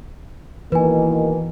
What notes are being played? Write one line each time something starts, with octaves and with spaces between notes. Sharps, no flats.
B2 D#3 E3 A#3 B4 G#5